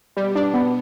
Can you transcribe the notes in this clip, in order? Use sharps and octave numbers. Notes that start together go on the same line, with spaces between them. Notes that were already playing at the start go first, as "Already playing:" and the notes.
B2 G3 B3
D4
B3